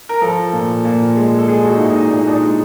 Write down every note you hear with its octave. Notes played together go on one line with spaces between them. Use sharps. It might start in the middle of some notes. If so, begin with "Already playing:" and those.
A#4
F3 A4
A#2
A#2
G#3
A4
G#3 G#4
F#4
D#4
A#2 E4
D#4
A#2 D4
D#4
D4
G#3